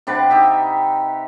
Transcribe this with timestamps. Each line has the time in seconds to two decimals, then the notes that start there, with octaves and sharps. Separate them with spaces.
0.07 C3 D4 B4 F#5
0.30 D#4 G4 E5